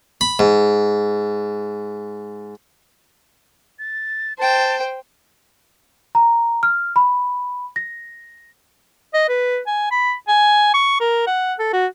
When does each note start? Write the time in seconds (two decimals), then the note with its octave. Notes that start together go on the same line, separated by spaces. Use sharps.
0.21 B5
0.39 G#2
3.79 A6
4.38 C5 G5 A5
6.15 A#5
6.63 F6
6.96 B5
7.76 A#6
9.14 D#5
9.29 B4
9.67 G#5
9.91 B5
10.28 G#5
10.74 C#6
11.00 A#4
11.27 F#5
11.59 A4
11.73 F#4